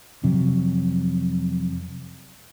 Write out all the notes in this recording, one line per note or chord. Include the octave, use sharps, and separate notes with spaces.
F2 C3 F#3